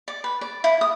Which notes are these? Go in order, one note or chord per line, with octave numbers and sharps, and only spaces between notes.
D5
B4
D5
E4
D#6